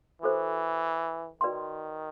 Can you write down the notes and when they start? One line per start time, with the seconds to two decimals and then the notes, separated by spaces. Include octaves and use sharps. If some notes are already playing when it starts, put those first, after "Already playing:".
0.22 E3 F#4 A4 C5
1.41 D#3 F#4 B4 D5 G5 C6